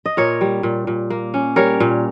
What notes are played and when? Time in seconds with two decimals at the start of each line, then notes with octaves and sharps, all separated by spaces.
0.06 D#5
0.17 A#2 A#4 C#5
0.41 G3
0.63 A#2
0.87 A#2
1.10 A#3
1.34 C#4
1.56 G3 A#4 C#5
1.80 A#2